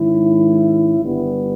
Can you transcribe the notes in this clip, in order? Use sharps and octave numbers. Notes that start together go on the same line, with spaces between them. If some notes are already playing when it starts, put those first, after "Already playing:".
Already playing: G#2 D#3 G#3 C#4 E4
G1 G2 G3 B3